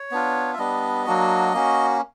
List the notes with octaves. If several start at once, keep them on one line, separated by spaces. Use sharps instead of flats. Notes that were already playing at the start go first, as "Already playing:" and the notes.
Already playing: C#5
B3 D4 F4
E5
G3 B3 D4 D#5
F#3 A#3 D4 F#4
A#3 C#4 F#4